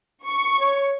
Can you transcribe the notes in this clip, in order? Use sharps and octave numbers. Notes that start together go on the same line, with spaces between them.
C#6
C#5